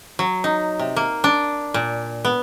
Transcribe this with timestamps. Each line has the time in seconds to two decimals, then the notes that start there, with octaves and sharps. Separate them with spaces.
0.19 F#3
0.44 D#4
0.79 C3
0.96 A#3
1.24 D4
1.74 A#2
2.25 B3